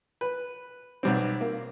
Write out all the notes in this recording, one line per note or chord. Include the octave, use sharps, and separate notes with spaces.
B4
B1 G3 C4
A#3